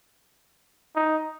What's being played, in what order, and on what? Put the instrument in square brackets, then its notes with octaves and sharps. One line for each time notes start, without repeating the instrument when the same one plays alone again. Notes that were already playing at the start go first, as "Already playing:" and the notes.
[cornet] D#4